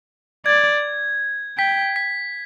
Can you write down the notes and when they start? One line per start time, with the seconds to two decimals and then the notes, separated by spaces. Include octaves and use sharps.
0.46 D5 G#6
1.58 G5 B6
1.96 B6